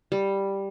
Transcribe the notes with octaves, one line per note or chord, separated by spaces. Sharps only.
G3